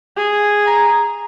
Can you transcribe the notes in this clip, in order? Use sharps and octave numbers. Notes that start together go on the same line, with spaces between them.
G#4
A#5